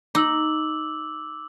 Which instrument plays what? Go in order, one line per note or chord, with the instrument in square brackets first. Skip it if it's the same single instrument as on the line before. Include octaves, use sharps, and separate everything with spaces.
[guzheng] D#4 [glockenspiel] D6 E6 F#7